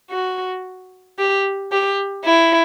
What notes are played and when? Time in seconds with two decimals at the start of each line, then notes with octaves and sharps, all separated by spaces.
0.11 F#4
1.19 G4
1.72 G4
2.25 E4